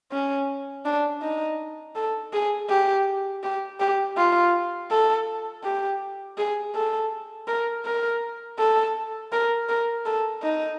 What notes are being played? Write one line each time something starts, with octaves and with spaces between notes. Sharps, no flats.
C#4
D4
D#4
A4
G#4
G4
G4
G4
F4
A4
G4
G#4
A4
A#4
A#4
A4
A#4
A#4
A4
D#4